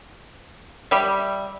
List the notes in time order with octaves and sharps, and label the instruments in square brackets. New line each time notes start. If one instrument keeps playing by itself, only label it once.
[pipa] G3 E5